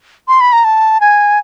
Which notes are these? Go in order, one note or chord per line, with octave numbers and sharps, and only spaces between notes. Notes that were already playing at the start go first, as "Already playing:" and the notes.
C6
B5
A#5
A5
G#5